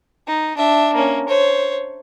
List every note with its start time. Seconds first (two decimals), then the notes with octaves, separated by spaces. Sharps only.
0.27 D#4
0.57 D4 E5
0.95 A#3 C#4
1.28 C5 C#5